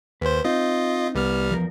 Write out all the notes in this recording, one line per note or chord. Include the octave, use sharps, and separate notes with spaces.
D#2 B4 C5
C4 D#4 F4 D#5
C2 G3 B3 F6
E2 F3 A#4